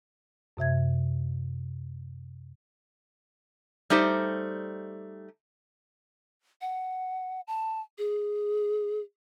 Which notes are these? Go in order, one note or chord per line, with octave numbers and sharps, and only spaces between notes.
F#2 C3 E5 G#6
G3 A3 D#4 G4 C5
F#5
A5
G#4